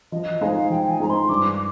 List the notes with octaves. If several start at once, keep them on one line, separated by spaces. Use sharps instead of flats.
F3 D#5
G#3 D#4 G#4 C5 F5
F3 G5
G#5
G#3 D#4 G#4 C5 A#5
C6
G2 D6